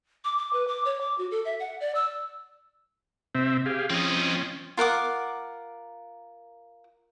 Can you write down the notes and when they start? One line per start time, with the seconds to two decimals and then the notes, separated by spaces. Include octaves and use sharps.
0.25 D6
0.38 D6
0.53 B4
0.68 D6
0.85 C#5
1.01 D6
1.18 F#4
1.31 A4
1.45 E5
1.60 F#5
1.81 D5
1.95 E6
3.35 C3 C4 E5
3.66 G4 G#4 F5
3.90 F3 C4 C#4 D#5
4.77 F4 A#4 F#5 D6